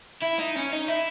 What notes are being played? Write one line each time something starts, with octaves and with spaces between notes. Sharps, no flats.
E4
D#4
C#4
D#4
E4